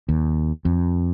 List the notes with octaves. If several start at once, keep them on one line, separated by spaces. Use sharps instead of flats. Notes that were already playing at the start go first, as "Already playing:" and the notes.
D#2
F2